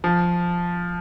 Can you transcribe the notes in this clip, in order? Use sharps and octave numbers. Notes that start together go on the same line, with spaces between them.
F3